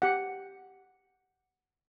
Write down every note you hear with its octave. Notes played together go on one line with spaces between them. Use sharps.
G4 F#5